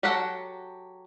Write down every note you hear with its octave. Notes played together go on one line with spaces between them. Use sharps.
F#3 G4 A4 F#5 A#5